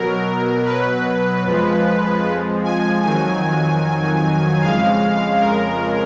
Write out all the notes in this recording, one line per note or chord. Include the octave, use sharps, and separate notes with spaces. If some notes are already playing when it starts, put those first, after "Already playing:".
Already playing: B2 F#3 A#4
B4
F2 F3 G#3
G#5
F2 D#3 F#3 G#5
F2 C#3 G#3 F5
A#4